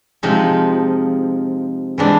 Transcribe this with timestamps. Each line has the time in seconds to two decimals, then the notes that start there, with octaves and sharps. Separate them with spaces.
0.23 C3 F3 G#3 D#4
1.98 C3 E3 G#3 D4